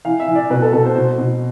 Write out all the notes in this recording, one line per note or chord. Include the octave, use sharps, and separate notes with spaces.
E3 F5
E5
E3
D5
B2 B4
A4
B2 A4
C5
B2 C5
B2